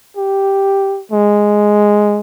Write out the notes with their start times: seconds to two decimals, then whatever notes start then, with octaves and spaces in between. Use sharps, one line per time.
0.17 G4
1.12 G#3